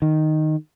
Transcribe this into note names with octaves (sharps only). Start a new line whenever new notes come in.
D#3